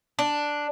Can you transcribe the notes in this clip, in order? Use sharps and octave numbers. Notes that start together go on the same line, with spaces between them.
D4